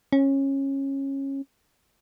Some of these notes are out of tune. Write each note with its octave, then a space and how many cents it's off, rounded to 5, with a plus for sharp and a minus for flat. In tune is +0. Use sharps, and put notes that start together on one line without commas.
C#4 -20